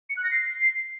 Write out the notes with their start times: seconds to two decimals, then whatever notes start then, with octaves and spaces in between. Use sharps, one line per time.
0.10 C#7
0.17 F#6
0.24 A#6
0.31 C7